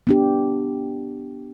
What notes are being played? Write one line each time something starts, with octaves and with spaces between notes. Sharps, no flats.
B3 D4 G4